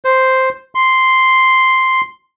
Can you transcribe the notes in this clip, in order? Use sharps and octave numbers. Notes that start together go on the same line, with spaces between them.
C5
C6